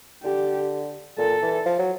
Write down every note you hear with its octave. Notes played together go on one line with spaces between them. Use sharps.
D3 G4
A#2 A4
E3
F3
F#3